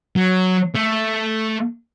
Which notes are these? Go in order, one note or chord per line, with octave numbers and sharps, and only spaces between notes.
F#3
A3